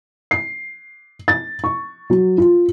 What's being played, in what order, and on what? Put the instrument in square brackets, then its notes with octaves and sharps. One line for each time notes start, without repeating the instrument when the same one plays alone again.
[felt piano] C7
A6
C#6
F#3
F4